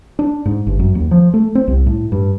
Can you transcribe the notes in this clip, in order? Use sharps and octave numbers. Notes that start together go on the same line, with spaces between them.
D4
G#2
G1
F#2
D#2
F3
A3
C4
C2
A2
G2